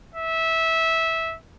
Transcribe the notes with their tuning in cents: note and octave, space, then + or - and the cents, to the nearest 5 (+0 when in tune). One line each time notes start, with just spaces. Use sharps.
E5 -15